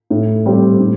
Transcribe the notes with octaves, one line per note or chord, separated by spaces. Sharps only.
A2
G3 C4 G4 C5
A2